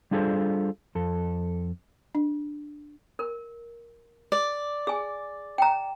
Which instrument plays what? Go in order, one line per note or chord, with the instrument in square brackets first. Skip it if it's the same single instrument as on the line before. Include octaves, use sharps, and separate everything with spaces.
[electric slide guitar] G3 D4 F4 G#4 A4 C5
F2 A4
[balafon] D4
[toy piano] A#4
[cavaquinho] D5
[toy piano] G#4 G#5
G5 A#5